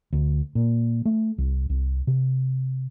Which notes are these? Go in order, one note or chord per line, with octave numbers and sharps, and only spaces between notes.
D2
A#2
A3
C2
C2
C3